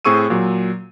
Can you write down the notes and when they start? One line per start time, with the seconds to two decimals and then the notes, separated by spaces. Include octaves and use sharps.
0.05 A2 C4 G#4 C#6 E6 D#7
0.30 A#2 F#3